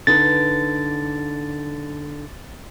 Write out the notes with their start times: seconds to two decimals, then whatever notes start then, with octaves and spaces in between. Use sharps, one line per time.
0.07 D3 D#4 B4 A6